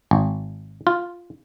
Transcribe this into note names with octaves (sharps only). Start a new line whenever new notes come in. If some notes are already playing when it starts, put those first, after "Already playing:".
G#1
F4